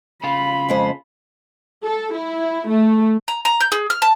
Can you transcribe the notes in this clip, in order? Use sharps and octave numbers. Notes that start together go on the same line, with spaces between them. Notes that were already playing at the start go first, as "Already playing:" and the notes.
C#3 F4 B5
F2 G#3 C5
A4
E4
A3
A#5
A#5
G6
G#4
F6
A5